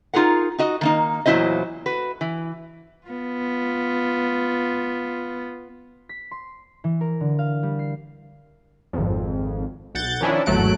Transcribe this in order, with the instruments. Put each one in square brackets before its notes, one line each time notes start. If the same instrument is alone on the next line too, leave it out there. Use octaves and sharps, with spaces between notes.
[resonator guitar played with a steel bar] D#4 F4 G#4 A#4 F#5
D#4 F#4 D#5
D#3 A#3 D#4
E2 A#2 F#3 E4 C5 D#5
F#4 B4
E3
[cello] B3 F4
[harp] B6
C6
E3
A#4
D3
F5
G3
C7
[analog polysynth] G#1 F2
B1 F#5 G6 A6
D#3 F3 C#4 D4 E4
G#1 E2 F#3 A3 F#6 D7